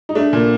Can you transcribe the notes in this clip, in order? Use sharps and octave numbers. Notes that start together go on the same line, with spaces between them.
D#4
A3 D4
A#2